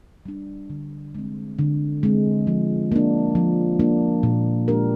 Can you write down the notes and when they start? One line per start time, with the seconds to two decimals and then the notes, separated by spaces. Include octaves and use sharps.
0.26 G3 D4
0.70 D3
1.15 G#3 C4
1.59 D3
2.03 G#3 C4
2.47 F3
2.92 A#3 D4
3.35 F3
3.79 A#3 D4
4.23 A#2
4.68 G#3 D4 G4 A#4